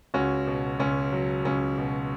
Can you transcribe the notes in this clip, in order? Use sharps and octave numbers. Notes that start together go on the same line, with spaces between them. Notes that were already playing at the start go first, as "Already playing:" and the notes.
C#2 C#4 F#4
B2
C#2 C#4
F#3
C#2 C#4
B2